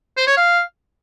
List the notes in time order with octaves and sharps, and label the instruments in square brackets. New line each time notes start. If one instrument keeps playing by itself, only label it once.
[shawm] C5
C#5
F5